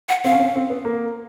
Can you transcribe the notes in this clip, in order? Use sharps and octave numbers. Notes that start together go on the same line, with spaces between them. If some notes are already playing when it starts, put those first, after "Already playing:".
F#5
C4 F5
C#4
C4
C4
B3
A#3